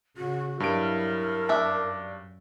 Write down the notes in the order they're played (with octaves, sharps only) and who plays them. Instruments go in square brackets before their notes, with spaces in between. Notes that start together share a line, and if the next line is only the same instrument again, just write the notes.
[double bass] C#3 [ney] F#4
[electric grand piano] G2 D7 [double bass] F#3 E4 [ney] A#4
[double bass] F#2 [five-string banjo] D4 E5